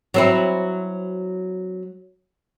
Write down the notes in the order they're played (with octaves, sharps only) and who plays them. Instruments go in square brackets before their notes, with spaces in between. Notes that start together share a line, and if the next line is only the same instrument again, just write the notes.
[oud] F#3 C4 E4